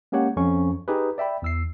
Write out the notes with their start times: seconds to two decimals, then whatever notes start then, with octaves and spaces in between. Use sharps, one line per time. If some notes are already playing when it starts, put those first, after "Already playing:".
0.12 G#3 A#3 C#4 G4 C#5 F#5
0.37 F2 C#4 C#6
0.88 D#4 G4 G#4 B4
1.18 D5 E5 G5 B5
1.42 E2 E6 C7